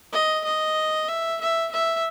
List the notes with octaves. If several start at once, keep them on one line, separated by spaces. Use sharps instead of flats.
D#5
D#5
E5
E5
E5